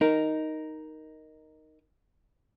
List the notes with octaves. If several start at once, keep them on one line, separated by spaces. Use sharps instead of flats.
D#4 A#4